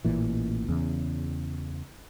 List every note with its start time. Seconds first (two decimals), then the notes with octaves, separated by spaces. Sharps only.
0.05 A1 A#2 E3
0.69 E2 C#3